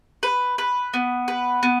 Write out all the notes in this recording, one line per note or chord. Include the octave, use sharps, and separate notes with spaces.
B4
B4
B3
B4
B3